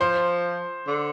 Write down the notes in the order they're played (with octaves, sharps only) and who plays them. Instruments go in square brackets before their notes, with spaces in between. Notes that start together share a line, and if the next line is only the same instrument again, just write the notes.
[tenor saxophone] F3 [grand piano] C5
[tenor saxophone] D3